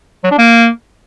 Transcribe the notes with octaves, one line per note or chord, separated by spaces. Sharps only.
F#3
D4
A#3